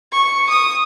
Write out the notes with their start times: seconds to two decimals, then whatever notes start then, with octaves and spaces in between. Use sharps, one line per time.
0.12 C#6
0.49 D#6